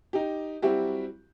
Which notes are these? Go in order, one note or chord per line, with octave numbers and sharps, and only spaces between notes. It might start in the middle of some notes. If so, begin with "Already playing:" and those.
D#4 G4
F#3 G3 C4 E4 F#4 G4